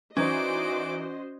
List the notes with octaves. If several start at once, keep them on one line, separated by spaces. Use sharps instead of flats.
E3 C#4 D#4 F#4 C5 D5 D#5 D6